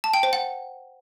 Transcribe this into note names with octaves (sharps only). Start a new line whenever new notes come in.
A5
G5
C5
F#5